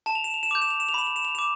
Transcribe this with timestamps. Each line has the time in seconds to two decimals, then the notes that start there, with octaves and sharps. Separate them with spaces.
0.06 A5 E7
0.15 F7
0.24 E7
0.34 F7
0.43 E7
0.51 D6 G6 F7
0.62 E7
0.71 F7
0.80 E7
0.89 F7
0.94 B5 E7
1.07 F7
1.16 E7
1.25 F7
1.35 D6 E7